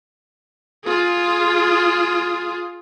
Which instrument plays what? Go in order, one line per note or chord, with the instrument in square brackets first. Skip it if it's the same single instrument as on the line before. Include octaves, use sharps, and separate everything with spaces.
[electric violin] F4 G#4